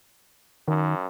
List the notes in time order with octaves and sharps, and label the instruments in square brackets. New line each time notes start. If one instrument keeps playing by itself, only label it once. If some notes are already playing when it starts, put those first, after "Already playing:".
[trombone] F#2 [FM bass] D#3